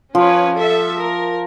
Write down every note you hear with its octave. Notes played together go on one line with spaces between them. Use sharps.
F3 C#4 B4 C#5
A4 E5
A#4